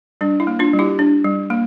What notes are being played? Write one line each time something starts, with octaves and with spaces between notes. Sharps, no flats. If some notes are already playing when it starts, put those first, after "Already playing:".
G3 D4
E4
A#3
D4 F4
G3
E4 G4
D4
G3
A#3